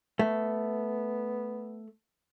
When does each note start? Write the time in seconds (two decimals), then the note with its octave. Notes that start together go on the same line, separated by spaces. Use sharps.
0.19 A3 B3